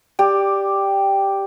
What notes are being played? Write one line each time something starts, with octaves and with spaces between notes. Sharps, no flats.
G4 D5